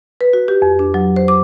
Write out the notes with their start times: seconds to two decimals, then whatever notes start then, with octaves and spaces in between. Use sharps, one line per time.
0.21 B4
0.33 F#4
0.48 G4
0.62 F2
0.79 D4
0.94 F#3
1.16 C5
1.28 D6